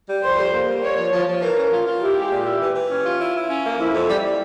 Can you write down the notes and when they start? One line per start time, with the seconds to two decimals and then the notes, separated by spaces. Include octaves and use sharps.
0.09 G3
0.23 F2 C5
0.38 G3
0.53 A#3
0.68 G3
0.82 A#3 C#5
0.98 F3
1.12 F3
1.27 F3
1.41 E3 A#4
1.57 C#4
1.72 F4
1.86 F4
2.01 E4 G4
2.16 G#3
2.31 A#2
2.45 E4
2.61 E3
2.75 E3
2.90 C#4
3.05 F4
3.20 E4
3.35 E4
3.49 C#4
3.64 A#3
3.79 F2 E4
3.93 F2
4.08 G3
4.23 G3